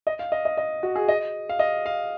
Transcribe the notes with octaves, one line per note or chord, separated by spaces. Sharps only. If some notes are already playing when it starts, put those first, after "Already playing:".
D#5
F5
D#5
D#5
D#5
F#4
G#4
D#5
F5
D#5
F5